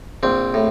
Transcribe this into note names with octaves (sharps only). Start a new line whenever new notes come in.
A#1 C4
A2